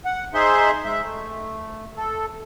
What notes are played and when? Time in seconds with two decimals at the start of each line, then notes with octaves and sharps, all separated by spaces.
0.05 F#5
0.34 D#4 G#4 C5 E5 C6
0.85 G#3 E5
1.02 A3
1.97 A4